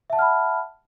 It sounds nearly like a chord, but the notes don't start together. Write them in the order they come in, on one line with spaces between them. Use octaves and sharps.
E5 A5 F#5 F6 B5